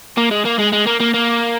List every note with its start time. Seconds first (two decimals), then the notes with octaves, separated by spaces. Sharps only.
0.17 A#3
0.31 G#3
0.45 A#3
0.59 G#3
0.72 G#3
0.86 A#3
1.00 A#3
1.14 A#3